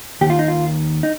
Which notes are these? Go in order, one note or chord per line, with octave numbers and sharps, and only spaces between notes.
D#2 D#3 F4 G4
D#4
F4
D#4